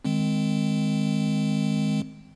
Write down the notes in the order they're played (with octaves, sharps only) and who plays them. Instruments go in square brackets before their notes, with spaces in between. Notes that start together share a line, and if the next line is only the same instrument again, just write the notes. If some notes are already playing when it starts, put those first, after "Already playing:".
[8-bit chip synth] D#3 G#3 C4